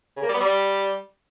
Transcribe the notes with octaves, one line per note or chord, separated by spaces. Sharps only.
C#3
A#3
G3
B3
G3